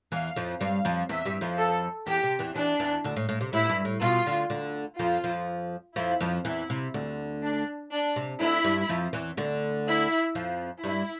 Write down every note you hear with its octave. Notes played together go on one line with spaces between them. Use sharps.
E2 E3 F5
F2 F3
G2 G3 F5
F2 F3
E2 E3 E5
G2 G3
F2 F3
A4
E2 E3 G4
C3
E2 E3
E2 E3 D4
E2 E3
D2 D3
A2
A2
C3
A2 E4
G2
A2
B2 F4
D2 D3
D2 D3
F2 F3 F4
F2 F3
F2 F3 E4
F2 F3
E2 E3 E4
C3
D2 D3
D4
D4
C3
D2 D3 E4
G2 G3
F2 F3
E2 E3
D2 D3
E4
F2 F3
G2 G3 E4